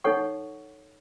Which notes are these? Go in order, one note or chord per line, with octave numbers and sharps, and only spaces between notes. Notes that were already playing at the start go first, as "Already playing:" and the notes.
D#4 A4 C#5 F#5 C#6